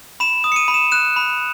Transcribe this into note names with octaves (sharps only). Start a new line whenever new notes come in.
B5 E7
D#6
C#7
D#7
B5
E7
F#6 E7
B5